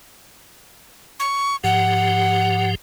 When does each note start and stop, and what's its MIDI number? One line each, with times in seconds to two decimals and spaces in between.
1.20 1.56 85
1.64 2.75 44
1.64 2.75 53
1.64 2.75 67
1.64 2.70 78